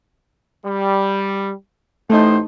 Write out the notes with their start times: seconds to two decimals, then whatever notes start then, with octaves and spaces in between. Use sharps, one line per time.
0.65 G3
2.10 A1 A2 A3 D#4 C5